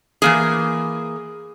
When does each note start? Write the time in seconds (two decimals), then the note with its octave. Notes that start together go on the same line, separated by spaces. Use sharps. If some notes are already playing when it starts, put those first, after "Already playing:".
0.22 E3 A#3 G#4